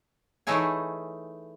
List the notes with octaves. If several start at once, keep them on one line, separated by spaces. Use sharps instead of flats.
E3 A3 D#4 E4 G#4 C#5